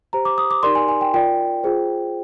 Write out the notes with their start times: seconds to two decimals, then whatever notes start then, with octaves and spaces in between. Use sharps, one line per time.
0.13 G4 C5 A#5
0.25 D6
0.38 D#6
0.51 D6
0.63 D#4 G4 A#4 D5 C6
0.75 G#5
0.88 G#5
1.01 G5
1.14 F4 A#4 D5 G5
1.64 F4 G#4 C5